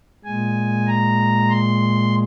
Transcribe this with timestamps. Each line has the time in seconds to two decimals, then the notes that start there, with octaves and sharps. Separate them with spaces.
0.25 A#2 G#3 G#5
0.88 A#5
1.50 C6